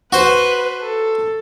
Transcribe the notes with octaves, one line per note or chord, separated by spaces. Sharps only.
F#4 B4 C5
A4